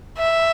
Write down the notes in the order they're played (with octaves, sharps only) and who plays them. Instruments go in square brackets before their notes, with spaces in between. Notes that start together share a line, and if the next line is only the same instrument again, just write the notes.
[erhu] E5